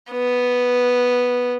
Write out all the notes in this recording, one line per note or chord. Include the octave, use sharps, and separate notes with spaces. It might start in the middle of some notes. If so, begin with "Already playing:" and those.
B3